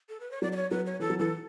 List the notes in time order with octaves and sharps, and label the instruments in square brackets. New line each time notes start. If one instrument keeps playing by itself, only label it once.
[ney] A4
B4
C#5
[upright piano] F#3 [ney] D5
[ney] D5
C#5
[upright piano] F#3 [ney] B4
[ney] C#5
[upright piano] E3 [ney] A4
[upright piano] F#3
[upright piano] E3 [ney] A4